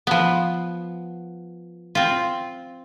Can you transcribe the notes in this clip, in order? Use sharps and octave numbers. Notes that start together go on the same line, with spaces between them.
F3 B3
C4 F4